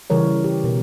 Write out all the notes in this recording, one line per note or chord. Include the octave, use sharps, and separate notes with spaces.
C#3 E3 G3 A#4 C#5
G4
B2 A#4